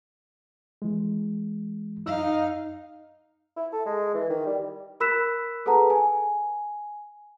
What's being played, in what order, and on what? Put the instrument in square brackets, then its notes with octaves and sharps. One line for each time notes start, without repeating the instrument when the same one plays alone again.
[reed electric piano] E3 G#3
[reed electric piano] F#2 E6 [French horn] D#4 [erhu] F5
[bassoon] E4
A4
G#3
E3
D#3
G3
[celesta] A#4 B5 E6 F#6 B6 E7
G#4 A4 B4 F#5 A5 A#5
G#5